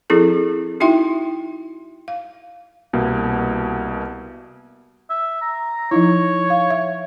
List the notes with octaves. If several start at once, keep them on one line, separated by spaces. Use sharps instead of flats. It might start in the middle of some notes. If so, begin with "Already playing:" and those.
F3 C4 E4 G#4 A4
D#4 E4 F#4 E5 G5 C6
F5
C2 B2 A#3
E5
A#5
F3 D#4 E4 C#5
F5
E5